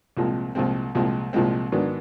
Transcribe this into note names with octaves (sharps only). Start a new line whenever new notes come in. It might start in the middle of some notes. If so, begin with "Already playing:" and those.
C2 A#2 F3 G#3 C4
C2 A#2 F3 G#3 C4
C2 A#2 F3 G#3 C4
C2 A#2 F3 G#3 C4
G#2 D#3 F#3 B3 D4